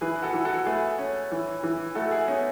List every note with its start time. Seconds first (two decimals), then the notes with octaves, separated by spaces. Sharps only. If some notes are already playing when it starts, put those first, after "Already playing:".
0.01 E3 G#4 B4
0.16 B4
0.22 F#4 A4
0.34 E3
0.45 F#4 A4
0.66 A3 G#4 B4
0.98 C#4
1.31 E3
1.63 E3
1.95 A3 F#4 A4
2.11 E4 G#4
2.27 B3 C#4 D#4